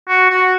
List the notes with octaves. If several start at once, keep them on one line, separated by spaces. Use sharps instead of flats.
F#4
F#4